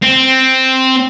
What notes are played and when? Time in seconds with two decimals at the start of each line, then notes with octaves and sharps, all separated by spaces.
0.02 C4